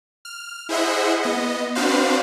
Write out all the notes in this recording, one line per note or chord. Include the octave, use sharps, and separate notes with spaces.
F6
E4 G#4 C5 D#5 E5 F#5
B3 D#5
C4 D4 F#4 B4 C5 F5